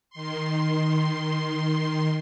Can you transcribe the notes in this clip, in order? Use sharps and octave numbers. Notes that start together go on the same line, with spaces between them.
D#3 C6